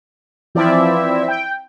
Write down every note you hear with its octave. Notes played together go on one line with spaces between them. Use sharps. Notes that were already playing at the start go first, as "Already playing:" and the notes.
E3 F3 C4 E4 D5 E5
G5